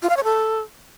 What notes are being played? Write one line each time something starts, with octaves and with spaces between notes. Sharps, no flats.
F4
F5
C#5
A4